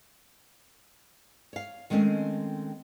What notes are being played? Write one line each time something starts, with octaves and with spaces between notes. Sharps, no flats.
C#5 F5
D#3 G#3 A3 C4 C#4